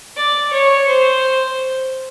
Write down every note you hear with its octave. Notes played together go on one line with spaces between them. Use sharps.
D5
C#5
C5